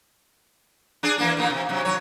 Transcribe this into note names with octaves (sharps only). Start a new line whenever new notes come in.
D4 G#4 D5
E3 A#3 D4
A#2 D#3 A#3
C3
C3 F#3
D#2 F#3 C#5